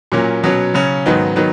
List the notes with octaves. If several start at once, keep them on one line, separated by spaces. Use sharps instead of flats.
A#2 F#3 A#3 C#4
B2 F#3 C#4
C#3 F#3 C#4
G#2 D#3 F#3 B3 D#4
D#3 F#3 B3